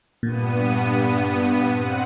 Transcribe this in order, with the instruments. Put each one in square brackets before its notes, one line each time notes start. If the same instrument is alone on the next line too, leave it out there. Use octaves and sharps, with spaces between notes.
[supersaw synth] G2 B3 D#7 [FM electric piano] A#2
[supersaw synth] C4 F#5 D#7